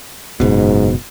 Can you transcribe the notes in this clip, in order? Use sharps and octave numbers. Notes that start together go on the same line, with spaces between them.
F#1 G#2 B2